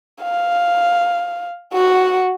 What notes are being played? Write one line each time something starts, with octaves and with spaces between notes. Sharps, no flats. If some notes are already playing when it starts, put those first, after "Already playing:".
F5
F#4 F#5